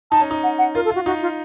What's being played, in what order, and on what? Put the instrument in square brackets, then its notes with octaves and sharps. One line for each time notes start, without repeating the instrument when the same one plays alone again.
[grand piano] D#4 [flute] A5
[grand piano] C#4
D#4
[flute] F#5
F#5
[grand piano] F4 [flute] A#4
[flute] A4
[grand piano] F4 [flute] F#4
[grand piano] D#4 [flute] F#4
[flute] F4